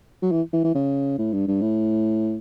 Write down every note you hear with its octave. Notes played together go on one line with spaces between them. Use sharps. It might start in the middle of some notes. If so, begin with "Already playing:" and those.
F#3
E3
E3
E3
C#3
A2
G2
G2
A2